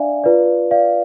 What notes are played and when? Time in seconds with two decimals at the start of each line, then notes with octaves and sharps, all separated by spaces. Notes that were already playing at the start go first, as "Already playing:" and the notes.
Already playing: D4 D5 E5 F5 G#5
0.24 F4 B4 D5
0.71 D5 F5